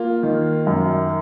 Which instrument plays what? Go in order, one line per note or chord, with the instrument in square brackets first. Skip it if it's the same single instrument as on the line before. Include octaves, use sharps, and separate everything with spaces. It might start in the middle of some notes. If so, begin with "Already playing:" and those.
Already playing: [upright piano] A#3 [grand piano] F4
[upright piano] D#3
F#2